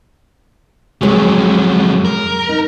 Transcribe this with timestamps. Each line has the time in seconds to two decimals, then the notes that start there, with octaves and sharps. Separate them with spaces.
1.01 F2 F#3 G#3 C#5
2.05 A#4
2.49 D#4